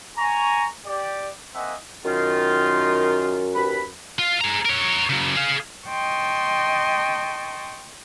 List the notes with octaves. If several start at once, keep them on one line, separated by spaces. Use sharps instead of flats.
G#5 A#5 C#6
G4 D5
A#3 C4 D#5 E5 F#5 G#5
F#2 D#3 F4
D#2 B4 B5
F4
G#4 A#5
A#4 C#5
C#3 F#3
G#4 F5
D#5 G5 A5 C6 C#6